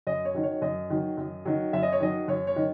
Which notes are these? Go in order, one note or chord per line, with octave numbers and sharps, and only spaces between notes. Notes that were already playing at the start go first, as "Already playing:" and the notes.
F#2 D#5
C#5
D#3 F#3
C#5
F#2 D#5
D#3 F#3
F#2
D#3 F#3
F#2 E5
D#5
C#5
D#3 F#3 D#5
F#2 C#5
C#5
D#3